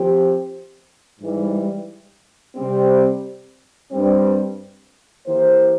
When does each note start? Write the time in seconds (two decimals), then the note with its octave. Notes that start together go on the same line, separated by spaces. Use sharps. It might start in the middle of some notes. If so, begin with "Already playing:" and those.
Already playing: F3 C4 G4
1.19 G#2 E3 G3
2.55 C3 G3 C4
3.91 G2 G3 C4
5.26 E3 A#3 E4 G4 C5